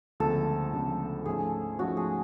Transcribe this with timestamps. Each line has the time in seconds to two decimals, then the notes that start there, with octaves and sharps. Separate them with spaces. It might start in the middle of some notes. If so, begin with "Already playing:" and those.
0.20 D2 C#3 F3 G#3 B3 A4
0.73 D2 C#3 F3 G#3 B3
1.26 G#2 F3 A3 C#4 G#4
1.79 G#2 F3 A3 C#4 F#4
1.97 G#4